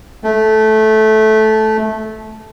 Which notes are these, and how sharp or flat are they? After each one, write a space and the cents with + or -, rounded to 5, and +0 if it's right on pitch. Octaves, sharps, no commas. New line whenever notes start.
A3 -15